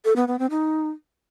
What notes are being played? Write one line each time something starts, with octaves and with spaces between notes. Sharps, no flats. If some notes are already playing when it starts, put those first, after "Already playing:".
A4
B3
B3
C4
D#4